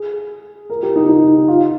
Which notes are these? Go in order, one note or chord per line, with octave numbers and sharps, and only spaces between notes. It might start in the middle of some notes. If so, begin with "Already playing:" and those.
Already playing: G#4
A#4
G4
D#4
D#4
F4